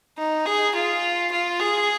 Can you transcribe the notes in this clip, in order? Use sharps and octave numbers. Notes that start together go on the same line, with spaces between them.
D#4
G#4
F4
F4
G#4